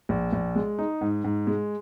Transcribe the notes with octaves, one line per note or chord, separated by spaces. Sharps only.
A#1
A#1
G#3
D#4
G#2
G#2
G#3